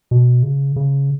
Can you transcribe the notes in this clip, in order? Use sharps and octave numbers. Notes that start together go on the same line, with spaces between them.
B2
C#3
C#3